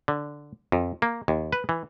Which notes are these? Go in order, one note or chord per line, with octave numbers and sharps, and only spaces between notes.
D3
F2
A#3
D#2
B4
E3